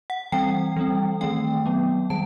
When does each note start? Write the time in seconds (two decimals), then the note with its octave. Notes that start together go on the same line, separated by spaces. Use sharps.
0.10 F#5
0.32 E3 G3 C4 G5
0.76 E3 G3 C4
1.21 D#3 A3 C4 G5
1.66 F#3 B3
2.10 D#3 G3 A5